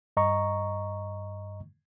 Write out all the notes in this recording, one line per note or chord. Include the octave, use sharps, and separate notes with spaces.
G2 D#5 A#5 C#6